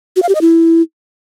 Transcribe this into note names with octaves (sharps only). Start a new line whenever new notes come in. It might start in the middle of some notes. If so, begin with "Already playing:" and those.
F#4
F5
G4
D#5
E4